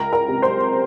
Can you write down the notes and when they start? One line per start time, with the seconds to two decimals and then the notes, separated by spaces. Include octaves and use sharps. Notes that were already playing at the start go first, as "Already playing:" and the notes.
Already playing: C#2 A#4 A#5
0.13 A#4 A#5
0.28 C3
0.42 C5 C6